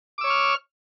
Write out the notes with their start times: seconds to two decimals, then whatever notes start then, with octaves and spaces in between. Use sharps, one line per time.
0.18 D6
0.21 E6
0.24 C#5
0.27 C#6
0.30 F6